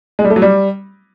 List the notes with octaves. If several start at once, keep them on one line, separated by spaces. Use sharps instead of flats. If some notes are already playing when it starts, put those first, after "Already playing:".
G#3
G3
A3
F#3
G3